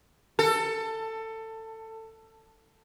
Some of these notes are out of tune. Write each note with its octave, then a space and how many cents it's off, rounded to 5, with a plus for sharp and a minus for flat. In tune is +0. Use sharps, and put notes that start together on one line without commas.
A4 +20